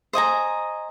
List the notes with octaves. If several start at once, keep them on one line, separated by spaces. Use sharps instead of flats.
C5 D#5 G#5 A#5